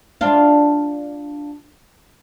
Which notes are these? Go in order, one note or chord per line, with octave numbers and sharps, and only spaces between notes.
D4 F4